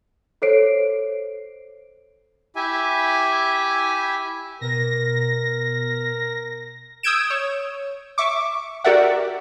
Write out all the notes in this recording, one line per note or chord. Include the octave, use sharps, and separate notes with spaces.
A4 C5 C#5 C7 D7
E4 G4 E5 G#5
B2 A#4 A#6
D#6 E6 G6 G#6 D7 E7
C#5
E5 C#6 D6
F#4 G4 A#4 D5 E5 F#5